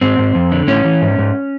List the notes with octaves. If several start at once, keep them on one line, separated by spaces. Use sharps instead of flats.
G#2 C4
G#2
F2
D3
A2 C#4
E3
G#2
G#2